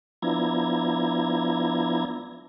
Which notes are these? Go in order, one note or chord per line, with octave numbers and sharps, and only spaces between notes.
F3 B3 D4 E4 A#5 G#6